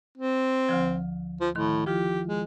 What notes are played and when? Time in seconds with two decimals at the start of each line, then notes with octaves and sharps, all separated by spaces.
0.18 C4
0.69 D2 D3 F3
1.41 F3
1.55 A2 D#3 C6
1.87 F3 E4 F4 G4
2.27 G#3